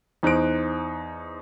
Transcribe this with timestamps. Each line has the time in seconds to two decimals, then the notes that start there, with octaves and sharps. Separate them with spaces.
0.23 E2 D#4 C5 F#6 D7